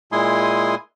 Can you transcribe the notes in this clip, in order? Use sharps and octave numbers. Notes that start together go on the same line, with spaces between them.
A#2 G#3 E4 G#5 C6 D#6